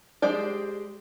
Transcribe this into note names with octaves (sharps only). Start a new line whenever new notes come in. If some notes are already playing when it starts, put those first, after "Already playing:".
G#3 G4 C5 D5